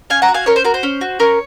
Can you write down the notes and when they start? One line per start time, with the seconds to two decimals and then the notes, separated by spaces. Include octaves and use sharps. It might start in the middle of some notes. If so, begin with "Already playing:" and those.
0.10 C#4 F5 G#5
0.22 F#5 A#5
0.28 F#4
0.34 F5 G#5
0.46 C#4 A#4 C#5
0.56 C5
0.64 F#4 A#4
0.74 C5
0.83 C#4
1.01 F#4
1.19 C#4 A#4 C#5